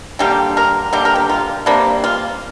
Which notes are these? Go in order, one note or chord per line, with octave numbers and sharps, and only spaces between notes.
D3 G3 A#3 G4
A#4
D3 G3 A#3 G4
A#4
G4
F4
C3 G3 A#3 D4
F4